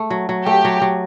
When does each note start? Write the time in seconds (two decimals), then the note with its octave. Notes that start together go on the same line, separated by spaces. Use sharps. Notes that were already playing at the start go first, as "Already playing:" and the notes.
Already playing: A3
0.10 F#3
0.29 F#3
0.46 A3 G4
0.65 F#3
0.82 F#3